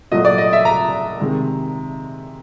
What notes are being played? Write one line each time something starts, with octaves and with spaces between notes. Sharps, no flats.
A#2 F#3 A3 D#5
D5
D#5
E5
A#5
C3 D#3 G#3